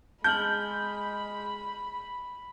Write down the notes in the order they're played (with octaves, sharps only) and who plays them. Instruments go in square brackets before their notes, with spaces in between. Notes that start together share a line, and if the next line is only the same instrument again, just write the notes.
[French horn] G#3 [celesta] A5 F6 F#7 [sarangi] B5 [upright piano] G6